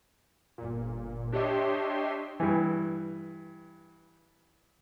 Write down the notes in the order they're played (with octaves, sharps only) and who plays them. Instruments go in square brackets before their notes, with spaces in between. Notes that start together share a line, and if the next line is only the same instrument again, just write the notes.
[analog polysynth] G1 A#2
D4 G4 C#5 D#5 E5 C6
[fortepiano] G2 E3